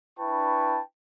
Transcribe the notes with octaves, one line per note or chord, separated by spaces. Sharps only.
D4 E4 B4 G5 A5 C#6